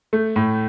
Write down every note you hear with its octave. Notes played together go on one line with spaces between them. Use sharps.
A3
A2